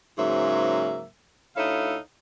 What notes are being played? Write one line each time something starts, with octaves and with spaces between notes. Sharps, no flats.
G#2 C#3 F#3 A#3 C5 E5
D2 D#4 E4 A4 C#5 F5